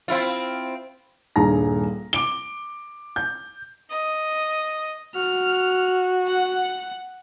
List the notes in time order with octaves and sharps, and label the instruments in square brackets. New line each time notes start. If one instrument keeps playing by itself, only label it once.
[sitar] C4 E4 F4
[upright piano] D#1 G2 G#4 A#5 A#6
D6 D7 G7
G6
[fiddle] D#5
[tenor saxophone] F#4 [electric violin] F6
[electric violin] F#5